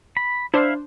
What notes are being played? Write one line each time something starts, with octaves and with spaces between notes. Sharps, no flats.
B5
D4 E4 C5 E5 F5